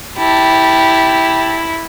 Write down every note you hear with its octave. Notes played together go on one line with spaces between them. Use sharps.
E4 G4 A5